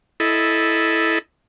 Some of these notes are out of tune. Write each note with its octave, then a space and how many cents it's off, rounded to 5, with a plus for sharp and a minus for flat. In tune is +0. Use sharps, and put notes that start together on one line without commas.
E4 +0 A4 -10 D#5 +0